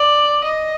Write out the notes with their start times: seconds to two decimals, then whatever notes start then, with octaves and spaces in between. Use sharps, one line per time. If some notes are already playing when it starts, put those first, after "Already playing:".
Already playing: D5
0.44 D#5